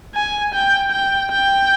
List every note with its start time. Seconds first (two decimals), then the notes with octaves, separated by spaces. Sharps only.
0.15 G#5
0.54 G5
0.92 G5
1.31 G5